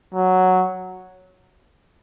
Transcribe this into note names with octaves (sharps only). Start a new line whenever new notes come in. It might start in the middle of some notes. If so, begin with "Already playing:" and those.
F#3